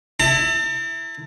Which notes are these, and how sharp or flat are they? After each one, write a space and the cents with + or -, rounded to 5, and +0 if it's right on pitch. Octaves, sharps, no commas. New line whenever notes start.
E4 +0 A5 +40